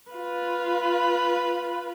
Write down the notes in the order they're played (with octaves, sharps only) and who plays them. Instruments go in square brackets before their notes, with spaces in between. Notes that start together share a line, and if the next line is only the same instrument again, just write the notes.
[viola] F4 B4